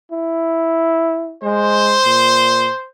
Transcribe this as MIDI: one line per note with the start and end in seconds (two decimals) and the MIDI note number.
0.11 1.35 64
1.43 1.98 56
1.43 2.87 72
2.05 2.68 46